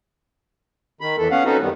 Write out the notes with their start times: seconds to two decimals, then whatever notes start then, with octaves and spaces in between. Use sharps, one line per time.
1.01 D#3 B5
1.18 E2 E3 A4
1.31 B3 C#4 F5 F#5
1.45 C4 C#4 D#4 F#4 A4 B4
1.61 F#2 D#3 G3 B3